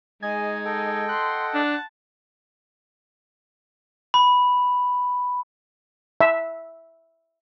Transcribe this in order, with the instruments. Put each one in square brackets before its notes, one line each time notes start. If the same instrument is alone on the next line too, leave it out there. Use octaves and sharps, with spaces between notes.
[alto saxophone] G#3 [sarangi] D#4 [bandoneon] G#4 D#5 [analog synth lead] G#5
[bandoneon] A4 D#5 G5
[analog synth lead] F#5 [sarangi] C6
[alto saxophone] D4 [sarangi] A5
[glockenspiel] B5
[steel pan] E5